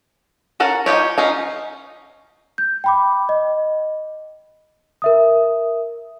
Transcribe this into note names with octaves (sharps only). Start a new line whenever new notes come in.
C#4 A4 A#4 F#5
D#4 F4 G4 C#5
C#4 D#4 F4
G6
G5 B5 D6
D#5
A#4 E5 D#6